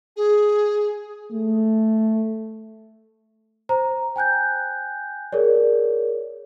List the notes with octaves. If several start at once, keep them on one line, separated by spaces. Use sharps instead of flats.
G#4
A3
C5 A#5
G5 G#5 F#6 G6
G#4 A#4 C#5 D5